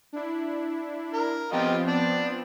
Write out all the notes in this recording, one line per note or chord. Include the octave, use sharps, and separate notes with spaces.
D4 E4
A#4
F3 B3 C4 F4 G4 D#5
D4